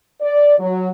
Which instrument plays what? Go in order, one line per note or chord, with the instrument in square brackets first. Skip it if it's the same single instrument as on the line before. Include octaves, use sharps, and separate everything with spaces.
[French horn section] D5
F#3